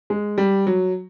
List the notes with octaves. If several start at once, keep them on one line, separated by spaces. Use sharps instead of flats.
G#3
G3
F#3